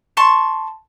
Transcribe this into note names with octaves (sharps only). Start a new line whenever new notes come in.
A5 C6 C#6